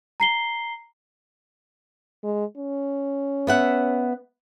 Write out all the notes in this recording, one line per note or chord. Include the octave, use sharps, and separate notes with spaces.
A#5 C7 G7
G#3
C#4
B3 E5 F#5